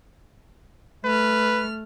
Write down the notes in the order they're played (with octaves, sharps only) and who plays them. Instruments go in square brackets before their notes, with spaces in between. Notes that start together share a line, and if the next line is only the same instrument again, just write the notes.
[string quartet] A3 F6 [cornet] B4